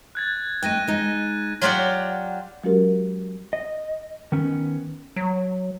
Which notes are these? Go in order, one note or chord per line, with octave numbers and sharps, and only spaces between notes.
F#6 G#6 A6
A3 D#4 G5 F#6 A#6 D#7
G#3 D#4
F#3 F4 G4 D5 F#5
F#3 G#3 C#4 F#4 G4 A#4
D#5
D#3 B3 C#4
F#3